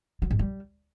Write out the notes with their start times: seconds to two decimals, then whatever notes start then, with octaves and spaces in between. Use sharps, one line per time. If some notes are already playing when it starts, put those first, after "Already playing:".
0.22 F#3
0.31 G#2
0.39 G3